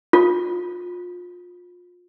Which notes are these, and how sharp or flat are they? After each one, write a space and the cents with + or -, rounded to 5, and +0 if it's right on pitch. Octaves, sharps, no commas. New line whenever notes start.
F4 +30 A4 +10